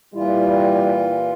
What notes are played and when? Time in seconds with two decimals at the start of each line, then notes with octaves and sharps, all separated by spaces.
0.14 A#2 E3 G3 E4 F4